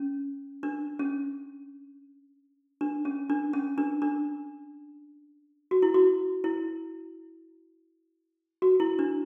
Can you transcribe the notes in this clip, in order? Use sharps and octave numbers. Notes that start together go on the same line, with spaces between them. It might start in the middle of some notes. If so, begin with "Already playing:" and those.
Already playing: C#4
D4
C#4
D4
C#4
D4
C#4
D4
D4
F#4
E4
F#4
E4
F#4
E4
D4